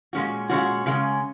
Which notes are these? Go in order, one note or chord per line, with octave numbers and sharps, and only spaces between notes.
A#2 G#3 C#4 F#4
A#2 G#3 C#4 F#4
C#3 G#3 C#4